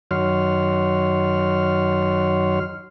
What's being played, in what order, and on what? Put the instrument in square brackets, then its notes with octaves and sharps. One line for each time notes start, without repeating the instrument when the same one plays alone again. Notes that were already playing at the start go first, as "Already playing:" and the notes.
[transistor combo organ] F#2 D#3 F#3 C#5 C6 F6